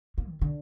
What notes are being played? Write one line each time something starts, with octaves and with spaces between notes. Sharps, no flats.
A#3
D#3
D3